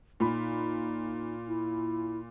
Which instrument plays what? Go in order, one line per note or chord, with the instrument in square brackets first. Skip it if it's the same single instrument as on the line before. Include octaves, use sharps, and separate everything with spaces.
[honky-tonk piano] A#2 B5 [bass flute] D#4
[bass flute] E4